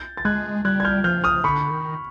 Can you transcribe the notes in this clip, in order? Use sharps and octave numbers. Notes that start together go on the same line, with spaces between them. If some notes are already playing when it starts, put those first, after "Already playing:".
Already playing: G6 A6
A6
G#3 F#6 G#6
G3 F#6 G#6
G#6
F6 G6
F3 F6 G6
D#6 F6
D3 B5 C#6
D#3